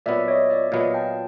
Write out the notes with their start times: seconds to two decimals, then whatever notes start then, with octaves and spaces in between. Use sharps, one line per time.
0.06 A#2 F#3 B3 D5 E5
0.28 C#5 D#5
0.50 D5 E5
0.72 A#2 F#3 B3 D#5 F5
0.94 G5 A5